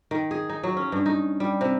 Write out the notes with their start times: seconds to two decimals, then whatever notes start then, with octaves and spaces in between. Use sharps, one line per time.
0.11 D#3
0.31 G#4
0.49 D#4
0.63 F#3
0.77 C#4
0.92 G2
1.06 D#4
1.40 G3
1.61 C3